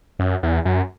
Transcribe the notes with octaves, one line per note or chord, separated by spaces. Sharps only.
F#2
E2
F#2